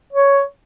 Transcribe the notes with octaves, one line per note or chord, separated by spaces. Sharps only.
C#5